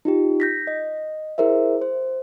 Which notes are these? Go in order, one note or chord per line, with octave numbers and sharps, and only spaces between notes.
D#4 F4 G4
G6 A#6 B6
D#5
E4 G#4 A#4 C5 E5
C5